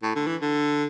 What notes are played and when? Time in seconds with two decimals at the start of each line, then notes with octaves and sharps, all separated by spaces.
0.03 A2
0.16 D3
0.27 E3
0.41 D3